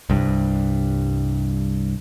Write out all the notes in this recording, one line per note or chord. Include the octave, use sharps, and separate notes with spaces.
C2 G2